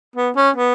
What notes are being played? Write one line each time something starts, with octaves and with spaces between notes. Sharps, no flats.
B3
C#4
B3